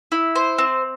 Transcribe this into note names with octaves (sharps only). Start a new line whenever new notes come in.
E4
C5
C4